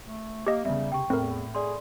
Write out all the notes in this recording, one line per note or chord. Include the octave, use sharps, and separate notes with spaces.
A3
A#3 G4 D#5
E2 C#3 G3 E5
C3 G5 C#6
E2 A2 C4 A#4
G#4 D5 C6